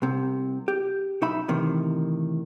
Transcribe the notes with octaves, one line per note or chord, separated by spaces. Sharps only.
C2 C3
G4
B1 D#4 E5 B5
A2 C3 D#3 E3